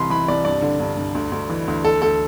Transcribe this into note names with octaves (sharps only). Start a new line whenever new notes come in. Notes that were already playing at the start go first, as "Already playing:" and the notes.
Already playing: C2 E3 B5 C6
E3 B5
C2 D5
G2 D5
D3
G2
G2
D2
D2
E3
D2
D2 A4
D2 A4